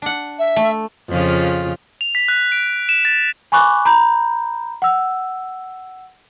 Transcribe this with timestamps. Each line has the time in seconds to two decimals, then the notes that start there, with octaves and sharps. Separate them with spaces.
0.02 D4 F#5
0.39 E5
0.56 A3
1.09 F2 C#3 F4
2.01 F7
2.15 B6
2.28 F#6
2.52 D7
2.89 E7
3.05 A6
3.52 G#5 B5 C#6 D6 F#6
3.85 A#5 B5 G6
4.82 F#5 E6